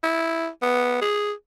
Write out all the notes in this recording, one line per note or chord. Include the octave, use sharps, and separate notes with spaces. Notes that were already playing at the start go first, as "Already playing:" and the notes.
E4
B3
G#4